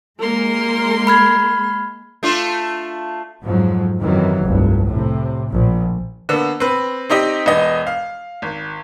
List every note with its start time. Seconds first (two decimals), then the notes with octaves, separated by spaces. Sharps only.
0.20 G#3 A#3 A#4 C6
1.07 B5 F6 G#6
2.23 A3 D4 F4
3.45 F2 G#2 F3 F#3
4.01 F#2 C3 D#3 E3 F#3
4.45 F1 C2 G2
4.89 A2 C3
5.51 A#1
6.29 D3 A#3 B3
6.60 C4 B4
7.10 C4 D#4 G4 D#5
7.46 E1 B3 D#5
7.87 F5
8.42 G#1